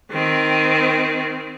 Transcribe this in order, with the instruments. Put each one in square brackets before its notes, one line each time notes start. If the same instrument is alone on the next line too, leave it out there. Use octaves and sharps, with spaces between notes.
[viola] D#3 C4